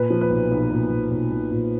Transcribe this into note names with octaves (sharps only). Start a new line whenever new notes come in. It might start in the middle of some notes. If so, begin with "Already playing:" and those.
Already playing: A#2 B4
F3
B4
B1
B1
A#2
B1
B1
B1
A#2